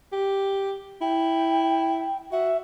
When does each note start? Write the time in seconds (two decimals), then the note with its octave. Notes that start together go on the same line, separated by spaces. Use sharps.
0.12 G4
1.01 E4 G5
2.32 F#4 E5